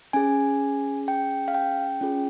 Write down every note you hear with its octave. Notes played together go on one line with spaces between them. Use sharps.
C#4 G#4 G#5
G5
F5
G5
C#4 F4 G#4